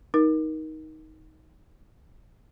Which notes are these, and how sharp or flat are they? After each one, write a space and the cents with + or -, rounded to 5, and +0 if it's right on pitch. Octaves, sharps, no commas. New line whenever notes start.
D#4 +10 A#4 +20